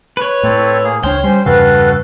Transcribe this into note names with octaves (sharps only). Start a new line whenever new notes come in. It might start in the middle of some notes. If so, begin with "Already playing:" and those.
B4 C#5
A2 C4 E4 A4
A#3 G#4
C#2 D4 C5 C#5 G5 F6
G3 C#4 C5 C6
E2 G2 C#3 F#4 A4 B4 F5